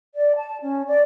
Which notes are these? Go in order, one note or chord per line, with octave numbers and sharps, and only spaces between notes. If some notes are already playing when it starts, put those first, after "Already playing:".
D5
A5
C#4
D5